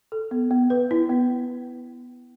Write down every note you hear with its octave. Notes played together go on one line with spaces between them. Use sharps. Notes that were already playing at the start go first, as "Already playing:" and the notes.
A4
B3
B3
B4
E4
B3